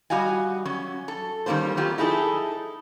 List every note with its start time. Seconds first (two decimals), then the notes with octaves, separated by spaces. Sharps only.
0.10 G3 F#4 D#5 F5 G#5
0.65 F#3 C#4
1.08 A4
1.46 D#3 G3 G#3 A#3 C#4 C5
1.77 F#3 A#3 C4 F4 G4
1.98 D#4 E4 G#4 A4